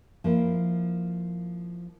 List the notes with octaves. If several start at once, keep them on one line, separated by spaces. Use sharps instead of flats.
F3 A#3 E4